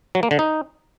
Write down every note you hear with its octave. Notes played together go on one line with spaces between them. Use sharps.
F#3
A#3
D3
D#4